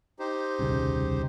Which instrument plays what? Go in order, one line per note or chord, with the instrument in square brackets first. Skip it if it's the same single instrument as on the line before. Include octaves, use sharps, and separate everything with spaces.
[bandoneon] D#4 G4 C5
[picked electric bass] D#1 C2 C#3